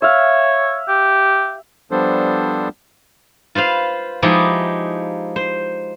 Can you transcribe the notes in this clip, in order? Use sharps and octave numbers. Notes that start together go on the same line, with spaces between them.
C#5 E5 F5
G4
F3 G3 B3 D4 A4 C5
F4 B4 C5 F5
F3 G#3 D#4 E4 G4
C5